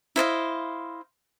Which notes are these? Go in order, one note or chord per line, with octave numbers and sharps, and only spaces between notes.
E4 C5 D#5 F5